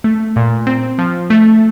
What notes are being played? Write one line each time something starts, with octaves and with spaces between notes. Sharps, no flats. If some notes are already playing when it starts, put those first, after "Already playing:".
A3
A#2
C4
F3
A3